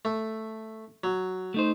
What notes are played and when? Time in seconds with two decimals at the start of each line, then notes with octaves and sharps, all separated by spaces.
0.05 A3
1.04 F#3
1.54 A3 D#4 C5